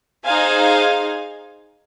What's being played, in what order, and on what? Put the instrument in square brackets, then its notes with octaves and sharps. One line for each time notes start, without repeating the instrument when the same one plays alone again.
[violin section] D#4 G#4 C5 F5 G#5